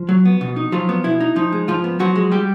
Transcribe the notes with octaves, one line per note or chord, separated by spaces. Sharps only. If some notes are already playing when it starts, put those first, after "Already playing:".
Already playing: F3
F#3
B3
B2
D#4
F3 F#3 F4
B3
B2 E4
D#4
F3 D#4
G#3
G#2 F3 F4
B3
F3 F#3 F#4
G#3
G3 G4